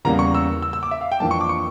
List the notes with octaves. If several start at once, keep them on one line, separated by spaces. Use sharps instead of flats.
E2 C#3 G3 A#3 A#5
C#6
E6
E6
E6
D6
E5
F5
G5
F2 E3 A#3 D4 A5
C#6
D6
C#6